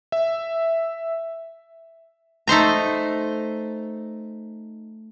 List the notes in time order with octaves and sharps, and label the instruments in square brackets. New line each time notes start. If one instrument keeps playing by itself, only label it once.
[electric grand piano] E5
[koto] A3 D#4 C5 A#5